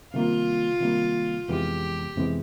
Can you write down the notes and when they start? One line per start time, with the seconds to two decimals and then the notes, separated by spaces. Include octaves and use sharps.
0.14 C3 D#3 G3 A#3 F4
0.81 C3 D#3 G3 A#3
1.49 F2 C3 E3 G#3 B3 G4
2.16 F2 C3 E3 G#3 B3